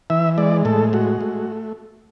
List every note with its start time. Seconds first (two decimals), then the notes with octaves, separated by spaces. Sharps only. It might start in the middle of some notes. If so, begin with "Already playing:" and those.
0.10 E3 E5
0.38 G#3 D5
0.65 A2 A4
0.93 G#3 F#4
1.21 A3